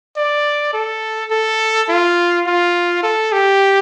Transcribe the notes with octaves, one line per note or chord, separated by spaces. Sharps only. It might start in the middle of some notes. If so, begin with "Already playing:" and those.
D5
A4
A4
F4
F4
A4
G4